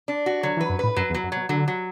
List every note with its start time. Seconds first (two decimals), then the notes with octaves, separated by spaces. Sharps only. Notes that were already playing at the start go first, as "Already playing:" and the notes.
0.08 D4
0.26 F#4
0.43 D3 F#3
0.57 E3
0.61 B4
0.70 F#2
0.79 A2 B4
0.96 F#2 F#3
1.10 E2
1.14 F#3
1.24 F#2
1.32 B2 F#3
1.49 D3 F#3
1.68 F#3